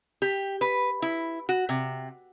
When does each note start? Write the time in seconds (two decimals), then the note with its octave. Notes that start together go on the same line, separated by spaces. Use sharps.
0.22 G4
0.61 B4
1.02 E4
1.49 F#4
1.69 C3